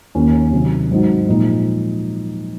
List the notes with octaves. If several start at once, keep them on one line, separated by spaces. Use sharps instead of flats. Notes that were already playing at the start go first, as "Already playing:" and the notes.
D#2 D#3 A#3 C#4
C3 D#3 F#3
G#2 F#3 C4 D#4 F#4
A#2 F3 G#3 D#4